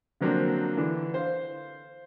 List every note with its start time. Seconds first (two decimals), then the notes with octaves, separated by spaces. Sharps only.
0.21 D3 F3 F#3 A#3 C4 D4
0.77 D3 E3 D4
1.14 C5 F5